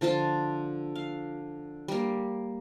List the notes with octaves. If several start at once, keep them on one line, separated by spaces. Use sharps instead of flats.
D3 F3 F4 A5
F5
G3 A#3